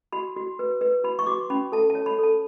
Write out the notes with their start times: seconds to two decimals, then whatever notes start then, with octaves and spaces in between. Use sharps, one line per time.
0.13 F#4 B5
0.36 F#4
0.59 B4
0.81 B4
1.04 F#4 B5
1.19 C#6
1.26 F#4 D6
1.50 C#4 B5
1.72 A4 A5
1.90 A5
1.95 C#5
2.06 B5
2.19 A4 A5